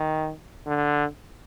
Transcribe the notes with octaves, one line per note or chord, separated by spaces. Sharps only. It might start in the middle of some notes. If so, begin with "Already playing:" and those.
Already playing: D#3
D3